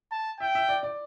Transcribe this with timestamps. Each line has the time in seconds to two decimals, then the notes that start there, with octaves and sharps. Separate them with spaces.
0.12 A5
0.40 E5 G5
0.55 E5
0.69 D5
0.83 D5